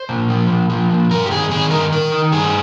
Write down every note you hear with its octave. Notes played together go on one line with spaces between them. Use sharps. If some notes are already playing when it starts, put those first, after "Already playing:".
Already playing: C5
A#2
F3
A#2
F3
A#2
G2 A#4
G4
D#3 G#4
D#3 G#4
G2 A#4
D#3 A#4
D#3
G2 G#4